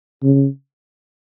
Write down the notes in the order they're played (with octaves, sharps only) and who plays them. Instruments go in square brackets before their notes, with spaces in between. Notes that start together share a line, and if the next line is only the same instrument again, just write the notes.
[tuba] C#3